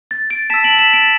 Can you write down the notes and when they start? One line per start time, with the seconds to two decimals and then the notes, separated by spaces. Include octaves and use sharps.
0.11 A6
0.30 A6 D7
0.50 A5 B6 E7
0.54 E6
0.64 D7 F#7
0.79 B6 E7
0.94 A6 D7